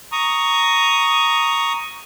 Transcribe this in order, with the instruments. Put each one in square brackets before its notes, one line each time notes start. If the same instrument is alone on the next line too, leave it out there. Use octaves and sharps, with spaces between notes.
[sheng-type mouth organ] A#5 C#6 D#6